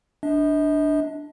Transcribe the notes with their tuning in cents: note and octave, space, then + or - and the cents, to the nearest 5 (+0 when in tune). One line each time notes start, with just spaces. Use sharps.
D4 +0 D#5 +40